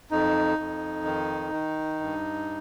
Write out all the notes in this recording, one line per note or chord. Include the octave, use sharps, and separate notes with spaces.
F2 D#4
F2
D#3
D#3
G2